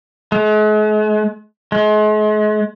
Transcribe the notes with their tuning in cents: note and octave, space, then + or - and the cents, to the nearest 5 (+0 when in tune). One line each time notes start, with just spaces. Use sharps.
G#3 +45
G#3 +40